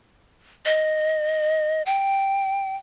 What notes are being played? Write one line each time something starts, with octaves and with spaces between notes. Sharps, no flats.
D#5
G5